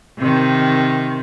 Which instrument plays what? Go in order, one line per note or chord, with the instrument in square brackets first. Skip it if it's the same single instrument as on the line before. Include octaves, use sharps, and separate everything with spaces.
[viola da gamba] C3 D#3